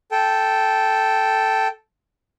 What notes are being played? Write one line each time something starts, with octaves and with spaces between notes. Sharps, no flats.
A4 G5